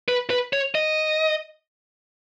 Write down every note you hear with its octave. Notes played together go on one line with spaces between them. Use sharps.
B4
B4
C#5
D#5